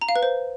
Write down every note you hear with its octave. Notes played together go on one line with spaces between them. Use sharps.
A#5
F5
B4
C5